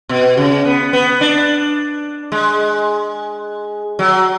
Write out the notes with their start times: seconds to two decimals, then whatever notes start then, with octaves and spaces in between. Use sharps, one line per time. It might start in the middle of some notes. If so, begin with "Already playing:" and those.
0.09 B2
0.37 C#3
0.65 B3
0.93 B3
1.21 D4
2.32 G#3
3.99 F#3